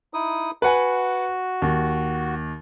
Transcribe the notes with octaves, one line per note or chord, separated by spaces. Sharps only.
D#4 E4 D#6
F#4 B4 F#5 G#5
D#2